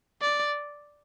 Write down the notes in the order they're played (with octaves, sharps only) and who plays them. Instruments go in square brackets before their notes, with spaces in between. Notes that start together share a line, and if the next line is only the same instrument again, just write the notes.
[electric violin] D5